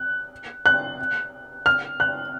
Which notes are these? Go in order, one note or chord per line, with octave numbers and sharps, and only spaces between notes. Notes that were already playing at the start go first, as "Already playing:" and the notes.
Already playing: F#6
F#6
F6
F#6